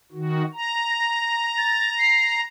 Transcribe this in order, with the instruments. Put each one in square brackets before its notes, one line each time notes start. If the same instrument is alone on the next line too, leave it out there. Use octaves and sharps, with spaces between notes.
[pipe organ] D#3 F#4
A#5
[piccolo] A#6
A6
C7